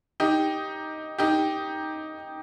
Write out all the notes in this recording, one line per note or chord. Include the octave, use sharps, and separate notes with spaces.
D#4 G4
D#4 G4